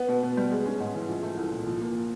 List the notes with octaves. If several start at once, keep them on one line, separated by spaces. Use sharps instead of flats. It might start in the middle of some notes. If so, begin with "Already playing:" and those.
Already playing: B3
B2
B2
G3
G#3
C#4
G#2
E3
F3
A3
C2
A#2
F3
A#3